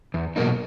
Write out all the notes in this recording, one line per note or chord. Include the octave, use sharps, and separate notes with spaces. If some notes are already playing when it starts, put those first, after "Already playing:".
E2
B2 F#3 A#3 D#4